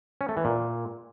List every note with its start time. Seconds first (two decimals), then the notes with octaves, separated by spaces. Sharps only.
0.21 C#4
0.29 A3
0.37 E3
0.45 A#2